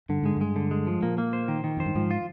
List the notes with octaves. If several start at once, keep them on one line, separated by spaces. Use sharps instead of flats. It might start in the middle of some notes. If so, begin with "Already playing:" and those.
G2 D3
G#2 G#3
G2 G#3
D3
G#3
F3
A#2 A#3
A#3
C5
D#3
D#3
F2 C5
G2
G#2 F3
F4